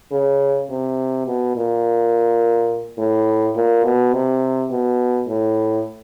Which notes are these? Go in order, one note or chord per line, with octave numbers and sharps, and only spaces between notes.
C#3
C3
B2
A#2
A2
A#2
B2
C3
B2
A2